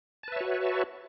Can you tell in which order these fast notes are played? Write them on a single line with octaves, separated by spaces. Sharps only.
A5 B4 E5 C#5 F#4